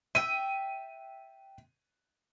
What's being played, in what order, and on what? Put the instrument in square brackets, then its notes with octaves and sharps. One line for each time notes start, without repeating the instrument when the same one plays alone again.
[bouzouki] E5 G5 [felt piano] D#7